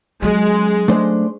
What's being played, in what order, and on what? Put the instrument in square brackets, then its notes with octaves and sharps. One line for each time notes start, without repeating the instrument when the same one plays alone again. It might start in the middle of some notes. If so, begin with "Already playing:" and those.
[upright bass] F#3 C#4 [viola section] G#3
[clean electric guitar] A3 D4 C5